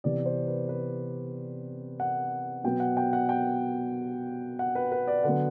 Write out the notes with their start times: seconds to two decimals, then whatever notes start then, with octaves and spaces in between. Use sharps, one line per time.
0.04 C3 E3 B3 D5
0.26 C5
0.47 B4
0.69 B4
2.00 F#5
2.64 B2 F#3 B3 G5
2.80 F#5
2.97 G5
3.13 F#5
3.29 G5
4.59 F#5
4.75 B4
4.92 B4
5.08 D5
5.24 D3 F#3 B3 F#5